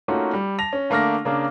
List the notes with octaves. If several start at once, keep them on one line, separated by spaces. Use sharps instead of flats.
A3 A#3 C#4 D#4 F4 F#4
G3
A5 A#6 F7
C#4
D3 A3 A#3 D4 F6 A#6
C#3 A#3 D4